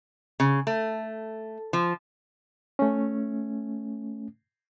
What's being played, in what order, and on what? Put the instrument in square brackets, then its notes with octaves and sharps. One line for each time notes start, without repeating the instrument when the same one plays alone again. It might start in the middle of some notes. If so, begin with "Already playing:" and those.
[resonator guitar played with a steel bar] C#3
A3
F3
[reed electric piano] A3 C#4